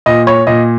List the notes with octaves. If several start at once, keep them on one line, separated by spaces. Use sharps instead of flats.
A#2 D#5
C#5
A#2 D#5